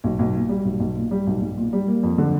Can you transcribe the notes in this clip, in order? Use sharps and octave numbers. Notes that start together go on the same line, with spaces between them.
B1
B1
A#2
G3
B1
B1
A#2
G3
B1
B1
A#2
G3
A#3
F2
D3